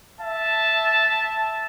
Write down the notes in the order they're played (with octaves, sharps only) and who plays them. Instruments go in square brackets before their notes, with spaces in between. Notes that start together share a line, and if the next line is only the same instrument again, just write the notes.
[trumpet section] E5 A5